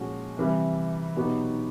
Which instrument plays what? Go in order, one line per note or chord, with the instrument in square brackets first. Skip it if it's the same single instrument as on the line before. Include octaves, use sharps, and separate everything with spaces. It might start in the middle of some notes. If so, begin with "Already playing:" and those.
Already playing: [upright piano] A#2 F3 G#3 C#4 F#4
C3 E3 G3
B2 F#3 B3 D#4 G4